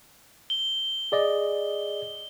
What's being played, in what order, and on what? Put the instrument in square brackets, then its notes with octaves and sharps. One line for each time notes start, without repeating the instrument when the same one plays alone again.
[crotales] G7
[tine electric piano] G#4 D5 D#5